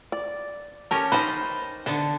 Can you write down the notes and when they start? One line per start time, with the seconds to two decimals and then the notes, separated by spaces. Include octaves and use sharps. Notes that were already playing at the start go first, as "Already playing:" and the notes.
0.12 D5
0.91 C#4 G4 A4 A#4
1.12 D#4 B4 C5 A5
1.86 D3 B3 D4 A4